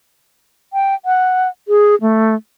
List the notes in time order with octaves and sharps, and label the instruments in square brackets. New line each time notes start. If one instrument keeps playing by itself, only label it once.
[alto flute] G5
F#5
G#4
A3